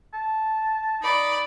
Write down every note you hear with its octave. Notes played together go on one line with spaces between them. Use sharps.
A5
D#4 D5 B5